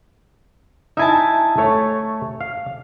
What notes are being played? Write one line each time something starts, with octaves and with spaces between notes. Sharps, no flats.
D#4 E4 E5 G#5 A5
A3 C#5
F5